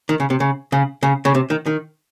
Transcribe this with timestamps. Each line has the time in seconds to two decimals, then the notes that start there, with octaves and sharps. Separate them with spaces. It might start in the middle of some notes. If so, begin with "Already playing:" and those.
0.09 D#3
0.20 C#3
0.30 C3
0.40 C#3
0.72 C#3
1.03 C#3
1.25 C#3
1.35 C3
1.50 D#3
1.66 D#3